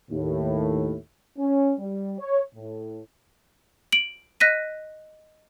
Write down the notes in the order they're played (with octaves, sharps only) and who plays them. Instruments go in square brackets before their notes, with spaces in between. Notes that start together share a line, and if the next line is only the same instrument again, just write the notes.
[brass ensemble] D#2 A2
C#4
G3
C#5
A2
[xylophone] D7 F#7
D#5 F#6 A#6 B6 D#7